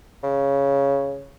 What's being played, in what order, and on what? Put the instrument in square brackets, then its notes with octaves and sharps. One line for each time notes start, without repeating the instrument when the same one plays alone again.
[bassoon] C#3